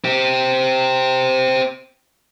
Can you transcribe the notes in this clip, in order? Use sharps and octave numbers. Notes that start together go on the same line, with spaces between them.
C4 G4